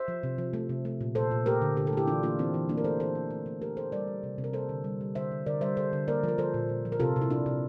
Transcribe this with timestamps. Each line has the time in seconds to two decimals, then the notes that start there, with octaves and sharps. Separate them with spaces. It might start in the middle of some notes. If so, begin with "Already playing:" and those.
Already playing: C5 E5
0.08 F3
0.23 C3
0.38 F3
0.53 A3
0.69 C3
0.85 A3
1.01 A#2
1.15 A#2 A4 C5
1.31 A#2
1.46 A3 G4 A#4
1.62 D3
1.77 D3 G4
1.87 A4
1.93 A3 E4 G4
2.07 E3 D4 F4
2.23 A#3 D4 F4
2.39 E3 C4 E4
2.54 E3
2.69 A3 A#3 D4
2.78 A#4
2.84 A3 A4 C5
3.00 E3 A4 C5
3.15 A3
3.31 A3
3.46 A3
3.62 A3 G4 A#4
3.77 A3 A4 C5
3.92 G3 A#4 D5
4.08 G3
4.23 C3
4.38 C3
4.44 A#4
4.53 A#3 A4 C5
4.69 D3
4.84 G3
5.01 G3
5.15 D3 C5 E5
5.32 D3
5.46 D3 A#4 D5
5.61 G3 C5 E5
5.77 D3 A4 C5
5.93 D3
6.08 A#3 A#4 D5
6.24 F3 A#4
6.38 F3 A4 C5
6.54 A#2
6.69 A#2
6.85 F3
6.92 A#4
7.00 C3 F4 A4
7.16 C3
7.22 E4
7.30 C3 D4 F4
7.46 C3